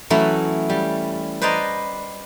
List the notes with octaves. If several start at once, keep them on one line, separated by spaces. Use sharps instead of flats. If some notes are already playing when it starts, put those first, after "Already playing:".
E3 F#3 A3 C#4 E4
G3
B4 C5 D5 D#5 A#5